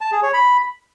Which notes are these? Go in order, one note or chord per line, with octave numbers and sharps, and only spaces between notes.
A5
G#4
C#5
B5